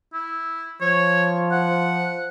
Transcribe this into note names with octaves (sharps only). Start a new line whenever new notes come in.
E4
F3 C#5
F#5